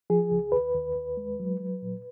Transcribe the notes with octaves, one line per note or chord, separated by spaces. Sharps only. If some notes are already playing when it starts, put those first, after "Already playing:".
F3 G#4
C#2
D#2 B4
D#2
D#2
G#3
F#3
F#3
A#2